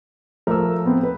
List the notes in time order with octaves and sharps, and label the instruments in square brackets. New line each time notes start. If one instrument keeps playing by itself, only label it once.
[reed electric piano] F3 A3 [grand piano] A#4 E6
[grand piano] B3 C4
B4